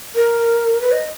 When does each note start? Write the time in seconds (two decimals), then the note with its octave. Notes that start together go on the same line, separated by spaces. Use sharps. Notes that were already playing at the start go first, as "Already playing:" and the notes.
0.15 A#4
0.81 B4
0.92 D#5